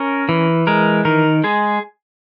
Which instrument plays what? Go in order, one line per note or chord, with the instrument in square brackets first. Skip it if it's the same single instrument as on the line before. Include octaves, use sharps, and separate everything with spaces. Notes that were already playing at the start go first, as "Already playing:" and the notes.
Already playing: [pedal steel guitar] C#4 A#4
E3
G#3 A#4
D#3 A#4
G#3 G#4